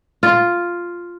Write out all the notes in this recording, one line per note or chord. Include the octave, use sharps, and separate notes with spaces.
F4